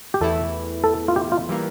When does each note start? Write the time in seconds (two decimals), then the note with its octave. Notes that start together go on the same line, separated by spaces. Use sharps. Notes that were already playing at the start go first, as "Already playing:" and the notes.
0.14 G4
0.21 E2 E3 A3 E4 A4
0.84 A4
1.08 F4
1.16 G4
1.32 F4
1.49 E3 G3 A#3